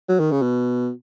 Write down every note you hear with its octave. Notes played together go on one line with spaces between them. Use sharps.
F#3
D#3
C#3
B2